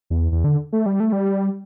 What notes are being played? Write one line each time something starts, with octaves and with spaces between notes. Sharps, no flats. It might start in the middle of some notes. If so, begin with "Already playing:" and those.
E2
E2
D3
A3
G3
A3
G3